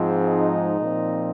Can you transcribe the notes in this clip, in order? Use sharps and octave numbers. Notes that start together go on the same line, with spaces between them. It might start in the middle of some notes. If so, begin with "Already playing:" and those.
Already playing: G#2 F3 G#3 C4
D#4
A#2 F3 C4